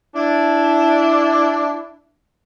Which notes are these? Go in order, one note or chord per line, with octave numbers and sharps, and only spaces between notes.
D4 E4